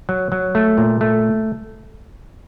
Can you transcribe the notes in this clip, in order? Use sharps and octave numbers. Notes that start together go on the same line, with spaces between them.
F#3
F#3
A3
A#2
A3